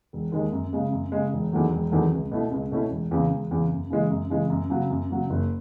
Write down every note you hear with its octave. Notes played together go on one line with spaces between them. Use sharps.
E1
D#2 D#3 G#3
F#2
C#3 G#3
F#2
C#3 G#3
E1
E2 D#3 F#3 A3
E1
E2 D#3 F#3 A3
C#2
B2 A3 C#4 E4
C#2
B2 A3 C#4 E4
E1
E2 C#3
E1
E2 C#3
F#2
C#3 E3 G#3
F#2
C#3 E3 G#3
F#2
C#3 F#3
F#2
C#3 F#3
F#1